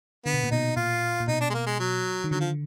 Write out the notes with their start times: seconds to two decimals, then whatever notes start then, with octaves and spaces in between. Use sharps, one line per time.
0.25 D3 B3
0.34 B2
0.44 A#2
0.51 B2 D#4
0.76 A#2 F4
1.20 A#2
1.28 B2 D#4
1.41 D4
1.50 G#3
1.54 A#3
1.67 G#3
1.80 F#3
2.24 D#3
2.31 D3 F#3
2.40 F3